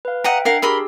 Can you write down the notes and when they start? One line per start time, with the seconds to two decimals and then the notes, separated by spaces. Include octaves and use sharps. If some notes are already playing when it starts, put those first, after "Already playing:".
0.05 B4 F5
0.24 D#5 E5 F#5 G5 A#5
0.45 D4 A#4 F5 F#5
0.62 G4 G#4 A#4 B5 C6 E6